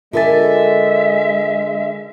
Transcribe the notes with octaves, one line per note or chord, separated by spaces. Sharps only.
D3 G#3 F4 A4 A#4 E5 G#5 A6